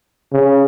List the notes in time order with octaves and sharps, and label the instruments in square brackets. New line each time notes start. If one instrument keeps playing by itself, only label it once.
[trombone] C#3